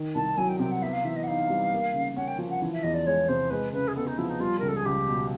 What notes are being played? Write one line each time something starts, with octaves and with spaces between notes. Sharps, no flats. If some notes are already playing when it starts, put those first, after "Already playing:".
Already playing: D#3
C2 A5
F#3 G#5
G5
C3 G5
F#5
B3 E5
F5
E3 E5
D#5
F#5
D#4 F5
G3
A#3
C#3
C#4 F#5
G5
F3
F#5
E3
E5
E2 D#5
D5
G#3 C#5
C3 C5
G#3 B4
C#3 B4
G#4
B3 A4
D#4
F3 E4
D#4
G3 F4
C#2 A#4
A4
G#4
C#2 G4
B2